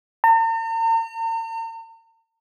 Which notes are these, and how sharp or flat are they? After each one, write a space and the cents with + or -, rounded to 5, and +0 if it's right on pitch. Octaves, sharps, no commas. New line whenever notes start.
A#5 -45